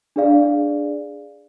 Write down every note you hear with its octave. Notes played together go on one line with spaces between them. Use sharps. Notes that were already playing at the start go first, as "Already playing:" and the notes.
D4 G#4 D5 F5